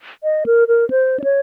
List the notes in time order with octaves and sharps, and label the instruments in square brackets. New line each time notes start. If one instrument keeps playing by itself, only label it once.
[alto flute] D#5
A#4
A#4
C5
D5
C#5